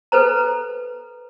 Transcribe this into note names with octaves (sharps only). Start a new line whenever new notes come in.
A4 B4 C5 A#5